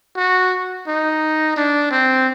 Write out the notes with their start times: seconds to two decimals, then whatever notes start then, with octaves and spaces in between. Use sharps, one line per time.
0.17 F#4
0.87 D#4
1.57 D4
1.91 C4